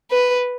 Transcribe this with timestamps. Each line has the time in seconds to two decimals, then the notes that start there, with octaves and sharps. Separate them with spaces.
0.11 B4